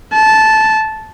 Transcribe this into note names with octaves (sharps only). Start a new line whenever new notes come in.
A5